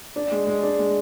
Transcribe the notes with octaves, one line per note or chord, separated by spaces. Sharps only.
D4
G#3
G#3
D4
G#3